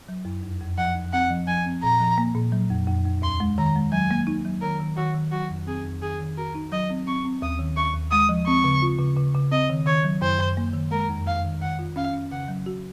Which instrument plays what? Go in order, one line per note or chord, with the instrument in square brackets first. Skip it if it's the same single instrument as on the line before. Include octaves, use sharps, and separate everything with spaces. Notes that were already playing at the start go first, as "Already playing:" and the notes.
[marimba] F#3
F#2
F2
F2
[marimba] F3 [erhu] F#5
[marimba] F2
[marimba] C4 [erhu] F#5
[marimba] F3
[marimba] F3 [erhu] G#5
[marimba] C4
[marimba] A#2 [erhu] A#5
[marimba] F3
A#3
A#2
F#3
F2
F2
F2
[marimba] D#2 [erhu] C6
[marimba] G#3
[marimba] D#3 [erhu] A#5
[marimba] G#3
[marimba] F#3 [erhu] G#5
[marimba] A#3
D#4
F#3
[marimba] D#3 [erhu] A#4
[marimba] D#3
[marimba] D#3 [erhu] F#4
[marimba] D#3
[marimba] F#3 [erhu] F#4
[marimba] F2
[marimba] C4 [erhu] G#4
[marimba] F2
[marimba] D#3 [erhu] G#4
[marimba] D#3
[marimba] F#4 [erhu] A#4
[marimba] D#4
[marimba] F#3 [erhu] D#5
[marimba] C4
[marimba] C4 [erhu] C#6
[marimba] C4
[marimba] D#2 [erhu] D#6
[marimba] D#3
[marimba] D#2 [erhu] C#6
[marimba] D#2
[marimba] G#3 [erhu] D#6
[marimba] F3
[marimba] C4 [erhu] C#6
[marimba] C#3
F4
C#3
C#3
C#3
[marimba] C4 [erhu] D#5
[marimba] D#3
[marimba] D#3 [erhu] C#5
[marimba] F#3
[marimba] F#2 [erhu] C5
[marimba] F#2
A#3
D#3
[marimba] G#3 [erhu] A#4
[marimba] F2
[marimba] F2 [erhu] F5
[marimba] D#3
[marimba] D#3 [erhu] F#5
[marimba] F4
[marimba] C#4 [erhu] F5
[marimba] C#4
[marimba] C#3 [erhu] F#5
[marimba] F#3
F#4